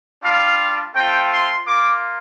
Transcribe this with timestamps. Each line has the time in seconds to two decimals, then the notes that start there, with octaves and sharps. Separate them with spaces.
0.23 G3 D4 F4 F5
0.94 A3 C4 F4 G5
1.30 C6
1.66 A#3 F4 D6